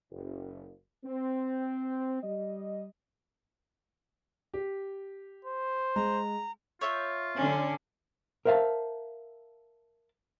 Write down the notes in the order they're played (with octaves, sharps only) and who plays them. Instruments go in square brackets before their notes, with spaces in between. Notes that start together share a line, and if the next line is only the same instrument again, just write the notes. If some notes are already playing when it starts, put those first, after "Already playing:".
[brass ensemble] F#1
C4
G3 D#5
[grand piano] G4
[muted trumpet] C5
[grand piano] G#3 [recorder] A#5
[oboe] F4 [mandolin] C#5 E5 G6
[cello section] D3 D4 [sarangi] C#4
[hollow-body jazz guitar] A#4 C5 E5 F5 A5